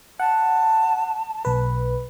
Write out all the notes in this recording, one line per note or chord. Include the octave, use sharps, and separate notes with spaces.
F#5 A5
B1 B4